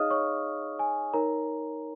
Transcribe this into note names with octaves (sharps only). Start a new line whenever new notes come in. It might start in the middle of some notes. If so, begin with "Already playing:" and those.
Already playing: D#4 G#4 C#5 D#5 F5 D#6 F6
C#5 C#6
G#5
D#4 A#4 C#5 A#5